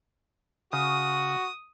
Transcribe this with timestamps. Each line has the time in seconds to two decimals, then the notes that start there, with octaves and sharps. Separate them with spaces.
0.73 C#3 F#4 D#6